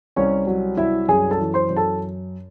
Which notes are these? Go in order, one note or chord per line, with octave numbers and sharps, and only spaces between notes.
C2 C#4 C#5
F#3
C2 E4 E5
F#2 G#4 G#5
A4 A5
E3
C5 C6
F#2
A4 A5